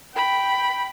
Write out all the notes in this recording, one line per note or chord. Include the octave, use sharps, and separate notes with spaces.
G5 B5